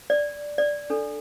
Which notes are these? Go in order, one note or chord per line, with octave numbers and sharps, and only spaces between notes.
D5
D5
D4 A4